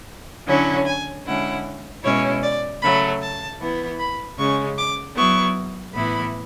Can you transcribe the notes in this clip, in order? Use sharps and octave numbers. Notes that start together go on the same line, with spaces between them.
D3 F#3 C#4 E4
G#5
D3 G#3 C#4 E4 F#5
B2 G#3 C#4 E4 C#5
D5
C#3 F#3 A3 B5
A5
E3 B3 E4
B5
C#3 G#3 C#4 C#6
D6
F#3 B3 E4 C#6
A2 E3 B3 E4 B5